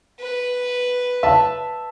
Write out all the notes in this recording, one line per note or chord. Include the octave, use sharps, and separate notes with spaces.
B4
E5 A5